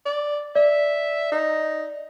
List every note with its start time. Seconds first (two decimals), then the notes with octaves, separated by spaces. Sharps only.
0.06 D5
0.55 D5 E5
1.32 D#4